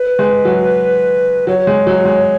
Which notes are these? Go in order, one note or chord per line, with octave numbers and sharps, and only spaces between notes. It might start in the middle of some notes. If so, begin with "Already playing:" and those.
Already playing: B4
G#3
F#3
F#3 C#5
G#3
F#3
G#3